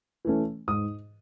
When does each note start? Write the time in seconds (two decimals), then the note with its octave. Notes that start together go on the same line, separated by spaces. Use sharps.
0.25 E3 A3 C#4
0.68 G#2 D#6